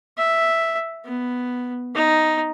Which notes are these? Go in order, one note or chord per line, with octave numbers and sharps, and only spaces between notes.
E5
B3
D#4